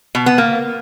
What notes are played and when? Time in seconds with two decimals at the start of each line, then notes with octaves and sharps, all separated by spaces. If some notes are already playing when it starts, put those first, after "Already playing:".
0.15 B2
0.26 B3
0.38 A#3